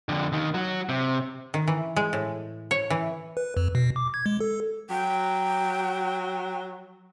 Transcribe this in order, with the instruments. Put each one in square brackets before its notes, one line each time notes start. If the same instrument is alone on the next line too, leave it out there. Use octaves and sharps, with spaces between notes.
[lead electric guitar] F2 D3
D#2 D#3
F#3 F#4
C3
[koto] D#3
E3
G#3
A2
C#5
E3
[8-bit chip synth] B4
F2
B2
D6
G#6
G#3
A4
[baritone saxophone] F#3 [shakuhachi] G5